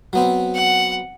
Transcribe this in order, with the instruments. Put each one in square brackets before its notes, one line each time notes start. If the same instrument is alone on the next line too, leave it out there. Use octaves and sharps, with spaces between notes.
[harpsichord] F#3 B3 C4
[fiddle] F#5